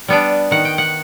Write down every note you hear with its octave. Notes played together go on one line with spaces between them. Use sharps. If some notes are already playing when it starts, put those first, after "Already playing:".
G3 B3 D4
D#3 F#5
G5
F#5